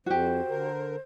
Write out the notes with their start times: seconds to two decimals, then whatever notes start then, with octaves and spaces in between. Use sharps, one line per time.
0.06 F2 F#4 G4 C5
0.49 D3 A#4